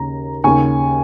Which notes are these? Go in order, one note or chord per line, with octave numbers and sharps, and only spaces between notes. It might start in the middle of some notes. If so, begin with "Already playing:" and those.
Already playing: D#2 C#3 A#5
D#2 C#3 G#5 C#6